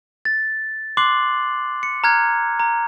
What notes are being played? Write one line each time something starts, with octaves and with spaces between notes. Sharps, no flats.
A6
C6 D6 F#6 C7 F#7
C#7
A#5 F6 F#6 G#6
A#5